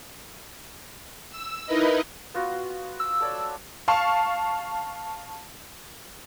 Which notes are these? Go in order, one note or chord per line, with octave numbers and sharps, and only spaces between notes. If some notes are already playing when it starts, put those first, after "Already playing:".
E6
D#4 E4 A#4 B4 D#5
B3 F4 F#4
E6
A4 C#5 D5
F5 A5 C#6